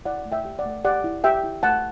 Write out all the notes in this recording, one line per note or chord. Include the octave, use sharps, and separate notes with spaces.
E4 D5 F#5
A3
E5 G5
G4
D5 F#5
A3
G4 D5 F#5
E4
G4 E5 G5
E4
A3 F#5 A5